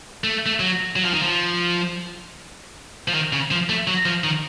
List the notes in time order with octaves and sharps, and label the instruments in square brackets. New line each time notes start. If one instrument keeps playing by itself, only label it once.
[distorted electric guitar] A3
A3
F#3
F#3
F3
D#3
F3
F3
D#3
C#3
F3
A3
F#3
F3
D#3